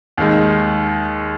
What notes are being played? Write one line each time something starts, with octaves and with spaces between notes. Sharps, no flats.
D#2 D#3 G#3